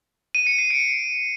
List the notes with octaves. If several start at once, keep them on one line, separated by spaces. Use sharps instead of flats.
D#7
C#7
C7
D7